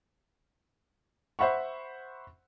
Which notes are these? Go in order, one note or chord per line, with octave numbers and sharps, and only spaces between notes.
C5 E5 F#5 B5 C#6